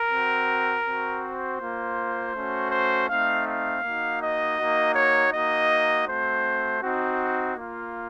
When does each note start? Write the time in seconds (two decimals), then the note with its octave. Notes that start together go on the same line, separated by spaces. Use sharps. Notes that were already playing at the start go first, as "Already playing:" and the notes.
Already playing: A#4
0.10 C4 F#4
0.84 C4 F#4
1.21 C5
1.59 A#3 F4
2.34 A3 C#4 F#4
2.71 C5
3.08 A3 C4 D#4 F5
3.45 F5
3.82 A#3 D#4 F#4
4.19 D#5
4.58 A#3 D#4 F#4
4.94 C#5
5.31 A#3 D#4 F#4 D#5
6.06 A3 C4 F#4 C5
6.81 C4 D#4 F#4
7.55 A#3 F4